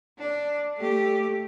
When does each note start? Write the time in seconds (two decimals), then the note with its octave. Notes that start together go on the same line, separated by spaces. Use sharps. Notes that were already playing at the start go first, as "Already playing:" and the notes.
0.18 D4
0.77 A3 G4